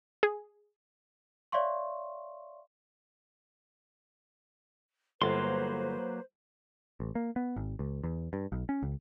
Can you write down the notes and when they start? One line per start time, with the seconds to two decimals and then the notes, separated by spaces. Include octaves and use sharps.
0.23 G#4
1.52 C#5 D5 E5 F5 C6 C#6
5.22 G1 F#3 A#3 B4 C5 C6
7.00 A1
7.15 A#3
7.36 B3
7.56 G#1
7.79 C#2
8.04 E2
8.33 G2
8.52 B1
8.69 C#4
8.83 C#2